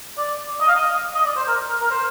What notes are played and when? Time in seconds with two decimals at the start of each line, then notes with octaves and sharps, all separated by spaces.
0.18 D5
0.61 D#5
0.68 F5
0.75 D#5
1.15 D#5
1.25 D5
1.36 C5
1.48 A#4
1.69 A#4
1.81 A#4
1.91 C5